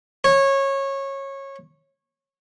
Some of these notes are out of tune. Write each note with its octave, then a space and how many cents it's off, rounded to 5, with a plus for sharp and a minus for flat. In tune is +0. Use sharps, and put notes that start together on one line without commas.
C#5 -20